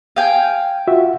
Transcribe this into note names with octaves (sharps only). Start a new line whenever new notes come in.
F5 G5 G#5
F4 F#4 E5